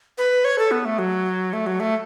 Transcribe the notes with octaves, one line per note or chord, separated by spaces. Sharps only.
B4
C#5
A4
B3
A3
F#3
A3
F#3
A3